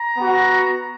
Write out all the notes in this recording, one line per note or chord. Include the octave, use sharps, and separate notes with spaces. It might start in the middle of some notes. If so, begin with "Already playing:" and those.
Already playing: A#5
B3 F#4